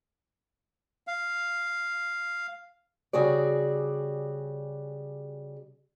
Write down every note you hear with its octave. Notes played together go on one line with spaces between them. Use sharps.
F5
C#3 G3 F#4 G#4 D5